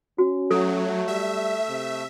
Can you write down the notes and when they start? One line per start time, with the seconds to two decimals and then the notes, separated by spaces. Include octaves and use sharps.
0.18 C#4 F#4
0.51 F#3 A3 A4
1.08 G3 E5
1.69 C3